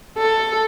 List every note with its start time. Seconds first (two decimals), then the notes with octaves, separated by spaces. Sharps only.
0.18 A4